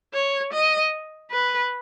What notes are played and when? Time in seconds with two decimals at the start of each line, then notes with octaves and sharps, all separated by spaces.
0.14 C#5
0.53 D#5
1.31 B4